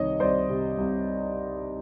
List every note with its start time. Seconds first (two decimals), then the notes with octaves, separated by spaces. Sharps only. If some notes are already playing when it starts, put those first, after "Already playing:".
Already playing: C2 C3 D#3 C#5 D#5
0.20 C2 C5 D5
0.50 C3
0.78 C2